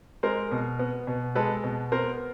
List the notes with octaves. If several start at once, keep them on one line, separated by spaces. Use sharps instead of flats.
G#3 A#4 C5
B2
B3
B2
G#3 A4 B4
B2
B3 A#4 C5